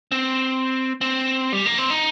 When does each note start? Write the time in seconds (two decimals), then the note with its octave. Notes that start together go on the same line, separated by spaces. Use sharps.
0.12 C4
1.01 C4
1.53 G3
1.66 A#3
1.78 C4
1.90 D#4